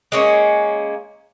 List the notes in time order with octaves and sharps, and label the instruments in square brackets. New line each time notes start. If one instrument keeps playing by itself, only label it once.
[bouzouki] G#3 A#3 C#4